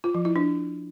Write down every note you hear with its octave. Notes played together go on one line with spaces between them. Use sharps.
F4
F3
E4
D4